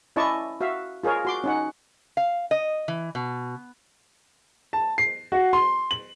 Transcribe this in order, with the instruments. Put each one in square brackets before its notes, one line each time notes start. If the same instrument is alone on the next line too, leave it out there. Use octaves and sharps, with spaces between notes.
[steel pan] C#4 E4 D5 D#5 A5 C#6
F#4 E5 F5
F4 G#4 A#4 C#5
F#4 C6 D6
C#4 D#4 F#5
[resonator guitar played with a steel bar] F5
D#5
E3
B2
[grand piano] A5
C7
F#4
C6
F#7